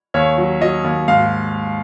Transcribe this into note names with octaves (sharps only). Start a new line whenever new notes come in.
D#2 C#5
F#3
F#3 D#5
D#2
G#2 F5